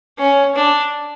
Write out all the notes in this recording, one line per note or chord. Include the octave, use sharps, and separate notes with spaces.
C#4
D4